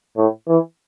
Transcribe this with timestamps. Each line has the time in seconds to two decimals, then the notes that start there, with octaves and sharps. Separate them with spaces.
0.17 A2
0.48 E3